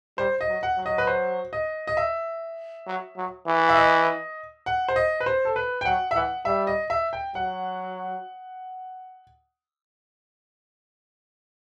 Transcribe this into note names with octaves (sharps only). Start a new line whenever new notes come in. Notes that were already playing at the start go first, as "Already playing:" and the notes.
G3 C5
D#5
F#3
F#5
F#3
D#5
B4
C5
D#5
D#5
E5
F#3
F#3
E3
E5
D#5
F#5
C5
D#5
B4
C5
A4
B4
G5
F#3 F#5
E5
E3 F#5
G3 E5
D#5
E5
G5
F#3 F#5